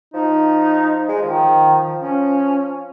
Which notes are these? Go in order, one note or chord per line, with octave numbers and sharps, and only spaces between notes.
F3 D#4
G#3
D#3 F3
C#4